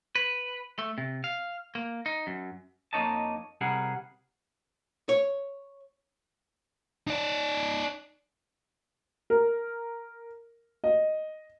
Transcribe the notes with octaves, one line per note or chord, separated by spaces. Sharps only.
B4
A3
C3
F5
A#3
D#4
F#2
F2 A#3 D#4 C#5 D#5 A5
C2 C3 G3 G#4 A#4 F#5
C#5
D#4 D5
A#4
D#5